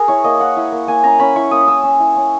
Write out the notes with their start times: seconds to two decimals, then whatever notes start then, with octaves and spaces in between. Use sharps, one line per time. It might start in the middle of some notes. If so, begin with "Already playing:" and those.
Already playing: G#4 A#4
0.08 E4 C#5
0.24 A#3 D#5
0.40 A#3 F#5
0.57 E4
0.72 A#3
0.87 A#3 G#5
1.04 C#4 A#5
1.19 C#4 B5
1.36 E4 C#6
1.51 A#3 D#6
1.67 C#4 E6
1.83 C#4
2.00 E4
2.16 C#4